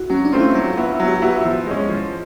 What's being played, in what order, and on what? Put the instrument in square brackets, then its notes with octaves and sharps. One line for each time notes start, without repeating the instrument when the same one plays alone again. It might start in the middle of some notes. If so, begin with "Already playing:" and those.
Already playing: [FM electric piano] E4 F#4
[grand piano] F#3 [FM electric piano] C#4
[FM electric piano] D4
[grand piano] A3 C4 F4
[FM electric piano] E4
[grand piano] F#3 [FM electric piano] F4
[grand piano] B3 E4
[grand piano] F#3 [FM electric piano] F#4
[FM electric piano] G4
F#4
[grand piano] B3 E4 [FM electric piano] G4
[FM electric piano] F#4
[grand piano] F3 [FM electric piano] E4
[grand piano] G#3 C#4
F3